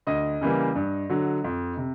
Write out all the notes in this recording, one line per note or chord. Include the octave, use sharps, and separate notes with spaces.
D2 D#5
C#3 E3 G3 A#3
G2
D3 F#3
F2
C3